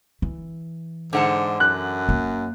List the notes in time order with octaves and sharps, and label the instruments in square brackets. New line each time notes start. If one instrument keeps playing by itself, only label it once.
[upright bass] E3
[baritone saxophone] G#2 [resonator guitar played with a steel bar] D3 F#5 A5
[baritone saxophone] F#2 [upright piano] F#6
[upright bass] A#3